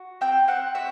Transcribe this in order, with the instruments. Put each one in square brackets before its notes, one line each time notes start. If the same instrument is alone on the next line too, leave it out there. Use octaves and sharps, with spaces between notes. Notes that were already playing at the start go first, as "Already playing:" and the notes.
Already playing: [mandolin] F#4
C4 G5
C4 F#5
F#4 E5